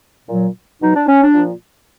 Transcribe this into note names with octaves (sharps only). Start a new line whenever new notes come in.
A#2 F#3
B2 F#3 D#4
D4
C#4
D4
A#2 F3